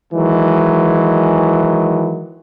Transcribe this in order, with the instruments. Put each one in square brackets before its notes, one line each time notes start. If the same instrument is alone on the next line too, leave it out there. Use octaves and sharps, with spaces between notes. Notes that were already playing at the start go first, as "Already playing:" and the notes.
[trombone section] D#3 E3 F#3 G#3